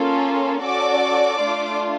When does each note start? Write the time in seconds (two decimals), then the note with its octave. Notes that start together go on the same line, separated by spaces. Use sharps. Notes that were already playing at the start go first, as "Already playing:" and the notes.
Already playing: A#3 C#4 F4 A4
0.62 C#4 F#4 A4 D5 D6
1.42 A3 D4 F4